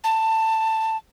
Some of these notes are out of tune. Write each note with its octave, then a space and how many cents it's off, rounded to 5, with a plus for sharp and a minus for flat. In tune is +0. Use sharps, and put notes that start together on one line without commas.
A5 +15